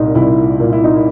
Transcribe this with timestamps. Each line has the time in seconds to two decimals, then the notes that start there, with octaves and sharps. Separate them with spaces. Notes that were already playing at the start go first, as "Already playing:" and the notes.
Already playing: C2 A#2 D#4
0.15 C2 E4
0.60 A#2 F4
0.73 E4
0.84 D#4
0.95 E4